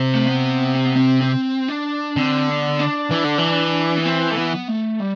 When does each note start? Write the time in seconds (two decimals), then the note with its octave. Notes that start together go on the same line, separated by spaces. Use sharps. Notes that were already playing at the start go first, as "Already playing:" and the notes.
Already playing: C3
0.15 A3
0.27 B3
0.74 C4
0.85 B3
0.96 C4
1.21 C4
1.68 D4
2.16 D3 C4
2.48 B3
2.79 D4
3.11 E3
3.24 D3
3.38 E3
3.97 B3
4.06 C4
4.31 A3
4.37 B3
4.68 A3
5.00 G3